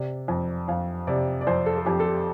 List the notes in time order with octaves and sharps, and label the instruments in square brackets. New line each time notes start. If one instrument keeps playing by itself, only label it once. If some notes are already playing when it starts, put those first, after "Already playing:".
Already playing: [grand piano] C3 D5
F2
F2 F5
C3 D5
D5
F2 C5
A4
A4
F2 G4
A4
G4